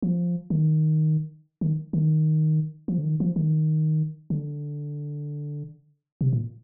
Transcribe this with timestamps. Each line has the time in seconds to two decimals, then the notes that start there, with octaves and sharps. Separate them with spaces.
0.02 F3
0.50 D#3
1.61 D#3
1.93 D#3
2.88 F3
2.98 D3
3.04 D#3
3.20 F3
3.36 D#3
4.30 D3
6.21 C3
6.33 A#2